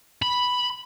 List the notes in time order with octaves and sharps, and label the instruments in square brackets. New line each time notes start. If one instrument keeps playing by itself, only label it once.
[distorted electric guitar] B5